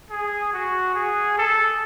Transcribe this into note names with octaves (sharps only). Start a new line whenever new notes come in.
G#4
F#4
G#4
A4